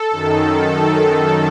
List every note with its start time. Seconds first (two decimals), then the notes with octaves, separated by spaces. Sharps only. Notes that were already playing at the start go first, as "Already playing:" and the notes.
Already playing: A4
0.11 F#2 D#3